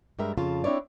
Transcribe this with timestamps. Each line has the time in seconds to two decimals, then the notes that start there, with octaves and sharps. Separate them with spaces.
0.19 G2 G3 G#3 A#4 E5
0.38 F2 C#3 F4 A5
0.64 C4 D4 E4 C#5 D5